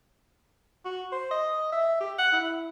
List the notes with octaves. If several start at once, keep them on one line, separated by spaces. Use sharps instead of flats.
F#4
C5
D#5
E5
G4
F#5
E4